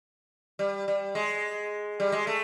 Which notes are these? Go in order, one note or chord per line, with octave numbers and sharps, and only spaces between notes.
G3
G3
G#3
G3
G#3
A3